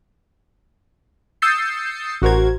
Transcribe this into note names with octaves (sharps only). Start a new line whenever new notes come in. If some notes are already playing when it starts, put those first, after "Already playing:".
D#6 E6 G6 A6 C7 C#7
A1 F#4 A#4 C5 G#6